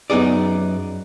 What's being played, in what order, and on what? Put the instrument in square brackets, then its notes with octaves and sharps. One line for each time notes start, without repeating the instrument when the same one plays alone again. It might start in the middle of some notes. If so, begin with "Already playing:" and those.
[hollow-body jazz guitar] F#2 B3 D#4 G#4 D5